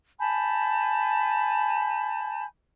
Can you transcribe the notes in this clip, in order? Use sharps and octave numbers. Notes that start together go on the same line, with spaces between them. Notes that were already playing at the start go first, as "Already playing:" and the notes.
G#5 A5 B5 G6